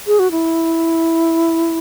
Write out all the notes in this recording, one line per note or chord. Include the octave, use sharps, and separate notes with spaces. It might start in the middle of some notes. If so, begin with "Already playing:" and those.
G#4
F#4
E4